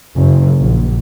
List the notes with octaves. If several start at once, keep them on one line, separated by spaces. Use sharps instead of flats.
F#1
A#1